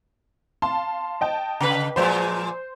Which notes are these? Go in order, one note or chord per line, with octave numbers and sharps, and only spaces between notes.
F5 A5 C6
D#5 G5 A5
C#3 B4
A#2 F3 G#3 C5